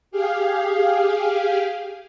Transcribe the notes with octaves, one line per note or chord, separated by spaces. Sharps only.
G4 G#4 F5